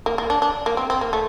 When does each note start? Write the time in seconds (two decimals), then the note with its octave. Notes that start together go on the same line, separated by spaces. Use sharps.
0.06 A#3
0.18 A#3
0.30 D4
0.42 D4
0.66 A#3
0.77 C4
0.90 C4
1.01 A#3
1.13 A3